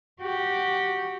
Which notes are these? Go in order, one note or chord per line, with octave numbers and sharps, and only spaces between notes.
F#4 G4